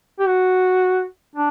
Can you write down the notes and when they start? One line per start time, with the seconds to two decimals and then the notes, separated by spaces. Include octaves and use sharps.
0.19 G4
0.27 F#4
1.35 D4